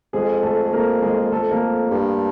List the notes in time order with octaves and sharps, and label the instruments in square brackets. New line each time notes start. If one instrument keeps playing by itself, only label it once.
[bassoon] F2 [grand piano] G#3 G#4
[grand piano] A3 A4
A#3 A#4
G#3 G#4
[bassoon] F2 [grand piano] A3 A4
[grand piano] A#3 A#4
[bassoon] G2